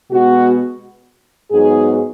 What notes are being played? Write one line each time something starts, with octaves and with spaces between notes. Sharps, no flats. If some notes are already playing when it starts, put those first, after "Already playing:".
B2 G#3 B3 F#4
G#2 F#3 B3 D#4 G#4